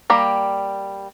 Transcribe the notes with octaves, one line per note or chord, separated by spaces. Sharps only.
G3 A#3 G4 A#5